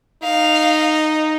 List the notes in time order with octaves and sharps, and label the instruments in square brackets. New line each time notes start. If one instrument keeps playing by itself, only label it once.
[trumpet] D#4 [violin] F5